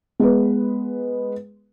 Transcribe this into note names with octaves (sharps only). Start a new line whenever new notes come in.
G#3 B3 B4